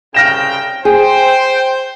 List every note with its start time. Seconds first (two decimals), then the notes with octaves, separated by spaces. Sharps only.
0.14 C2 C#3 G5 F6 A#6 E7
0.85 G#4 C5 G5